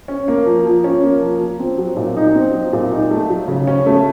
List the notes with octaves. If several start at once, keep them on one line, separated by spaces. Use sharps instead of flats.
C#4
A#3
F3
F3
C#4
A#3
F3
F3
C4
F#3
A#2
D#4
C4
F#3
A#2
D#4
A3
F#3
C#3
C#4
A3